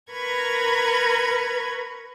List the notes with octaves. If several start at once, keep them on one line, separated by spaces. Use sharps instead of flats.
A#4 B4 A#5 B5 C#6 G#6